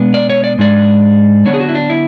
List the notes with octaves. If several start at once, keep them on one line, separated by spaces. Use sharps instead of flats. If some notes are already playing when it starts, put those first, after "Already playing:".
Already playing: B2 G#3 B3 D4
D5
C#5
D5
G#2 G#3 D4 D5
D3 F#3 B3 D4 C#5
G#4
F#4
E4
D4
E4